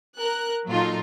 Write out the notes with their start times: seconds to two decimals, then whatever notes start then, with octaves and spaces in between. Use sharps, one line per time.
0.19 A#4 F#6
0.69 A#2 F#3 D#4 F4 A4